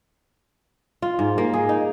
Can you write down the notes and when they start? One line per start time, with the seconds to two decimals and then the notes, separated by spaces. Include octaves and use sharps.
1.02 F4
1.19 G#2
1.38 A#3
1.53 G#4
1.69 D#4